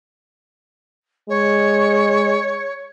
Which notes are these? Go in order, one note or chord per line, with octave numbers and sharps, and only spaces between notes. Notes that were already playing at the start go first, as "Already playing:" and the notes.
G#3 C#5